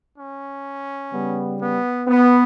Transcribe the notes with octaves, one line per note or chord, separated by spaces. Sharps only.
C#4
C#3 G3 B3
B3
B3